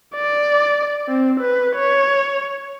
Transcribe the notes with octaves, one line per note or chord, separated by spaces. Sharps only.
D5
C4
B4
C#5